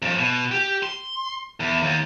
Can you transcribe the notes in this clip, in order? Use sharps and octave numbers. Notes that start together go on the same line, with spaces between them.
F2 C#4
B2
G4
C6
E2
D#2